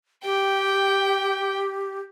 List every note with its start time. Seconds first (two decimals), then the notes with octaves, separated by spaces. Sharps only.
0.24 G4 G5